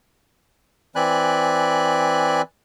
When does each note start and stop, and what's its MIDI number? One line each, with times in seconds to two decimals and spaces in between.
0.95 2.42 52
0.95 2.42 60
0.95 2.42 74
0.95 2.42 80
0.95 2.42 83
0.95 2.42 90